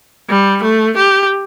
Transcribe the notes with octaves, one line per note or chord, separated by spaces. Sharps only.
G3
A3
G4